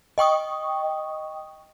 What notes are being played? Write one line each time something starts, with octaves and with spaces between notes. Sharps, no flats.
D#5 G5 C#6 D#6